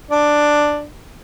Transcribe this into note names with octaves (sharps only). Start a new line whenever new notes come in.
D4